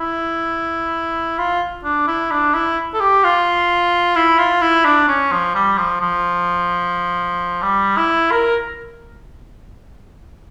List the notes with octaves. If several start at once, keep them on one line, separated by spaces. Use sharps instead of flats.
E4
F4
D4
E4
D4
E4
A4
G4
F4
E4
F4
E4
D4
C#4
F3
G3
F3
F3
G3
E4
A#4